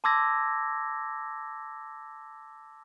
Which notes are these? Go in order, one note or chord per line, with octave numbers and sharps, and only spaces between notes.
A5 C6 D6 E6 G#6 A#6